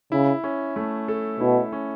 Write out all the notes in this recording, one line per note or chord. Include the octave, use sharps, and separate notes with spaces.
C#3 E4
C#4
A3
A4
B2 E4
C#4